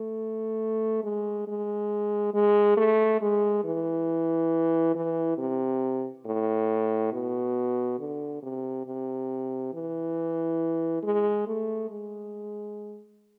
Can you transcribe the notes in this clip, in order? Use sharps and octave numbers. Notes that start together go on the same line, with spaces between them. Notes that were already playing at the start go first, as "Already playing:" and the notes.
Already playing: A3
G#3
G#3
G#3
A3
G#3
E3
E3
C3
A2
B2
D3
C3
C3
E3
G#3
A3
G#3